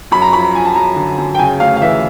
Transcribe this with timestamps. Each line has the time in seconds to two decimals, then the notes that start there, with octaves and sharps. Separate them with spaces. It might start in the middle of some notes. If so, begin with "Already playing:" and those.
0.11 F#2 B5
0.22 A#5
0.33 F3 B5
0.55 F3 G#5
0.65 A5
0.75 F#2 A#5
0.96 D3
1.18 F#2
1.35 G5
1.39 C#3 G#5
1.60 D2 F5
1.77 F5
1.81 E3 E5